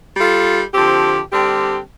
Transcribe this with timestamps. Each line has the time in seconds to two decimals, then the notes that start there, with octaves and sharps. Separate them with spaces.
0.16 G3 F4 A4
0.73 D3 F3 C4 G4
1.32 D3 G3 C4 G4